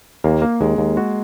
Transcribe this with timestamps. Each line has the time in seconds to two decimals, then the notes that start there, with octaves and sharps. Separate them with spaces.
0.24 D#2 A#3
0.42 A#3
0.61 D#2 G#3
0.78 D#2
0.97 G#3 F#4